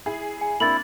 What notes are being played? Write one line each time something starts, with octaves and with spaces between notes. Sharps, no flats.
E4 G#4
G#5
A#3 C4 D4 E4 A6 F#7